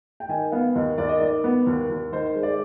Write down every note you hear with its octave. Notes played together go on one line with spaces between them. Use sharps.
G5
D#3 G#5
B3 F5
D#2 D#5
D#2 D5
D#5
D#3 D5
B3
D#2
D#2
D#3 C5
G#3
D5